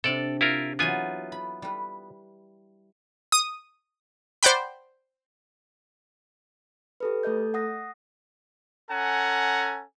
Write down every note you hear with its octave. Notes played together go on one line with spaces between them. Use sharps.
C3 D4 A4 D5
E4 F4 A#4
E3 F#3 B3 F4 G#5
B5
G3 B4
D#6
C5 D5 F#5 G5 B5
G4 A4 B4
A3 A4 D#5 G6
F#5 D#6 A#6
C#4 A4 F#5 G#5 A#5